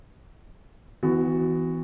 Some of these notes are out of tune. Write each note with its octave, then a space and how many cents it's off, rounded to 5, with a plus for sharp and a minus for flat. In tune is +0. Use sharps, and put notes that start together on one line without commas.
E3 -20 B3 +30 F#4 +0